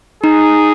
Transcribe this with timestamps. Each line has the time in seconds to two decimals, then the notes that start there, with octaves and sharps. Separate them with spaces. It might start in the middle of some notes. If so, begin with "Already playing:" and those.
0.23 D#4 G#4